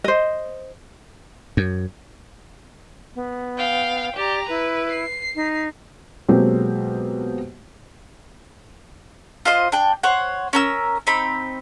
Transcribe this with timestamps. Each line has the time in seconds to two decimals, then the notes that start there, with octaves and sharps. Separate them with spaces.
0.04 C5 D#5
1.57 F#2
3.15 B3
3.57 F5 G5
4.16 G4 D5 A#5
4.49 E4 B4
4.90 C7
5.35 D#4
6.29 B2 F#3 G#3 A#3 C4 G4
9.45 F4 C5 D#5
9.72 D4 G5
10.03 C5 C#5 F#5
10.53 C#4 A#4 E6
11.07 C4 D#4 B5